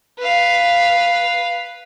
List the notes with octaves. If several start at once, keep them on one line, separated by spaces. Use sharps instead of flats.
B4 F5